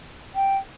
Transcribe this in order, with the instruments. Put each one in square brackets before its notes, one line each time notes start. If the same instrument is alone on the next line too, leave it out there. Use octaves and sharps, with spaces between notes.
[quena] G5